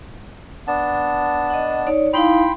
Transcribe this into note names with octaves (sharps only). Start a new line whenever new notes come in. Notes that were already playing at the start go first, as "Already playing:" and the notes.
B3 D4 A5
D#5 F#5
D#4 C#5 D5
D#4 E4 F5 G5 B5 C6